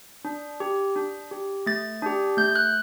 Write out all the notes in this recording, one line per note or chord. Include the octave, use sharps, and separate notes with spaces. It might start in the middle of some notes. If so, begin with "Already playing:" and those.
D4
G4
D4
G4
A3 A6
D4 G4
A3 G6
F#6